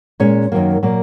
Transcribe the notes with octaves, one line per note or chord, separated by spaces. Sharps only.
A#2 G#3 C#4 C#5
F#2 D#3 F#3 A#3
A#2 F#3 A#3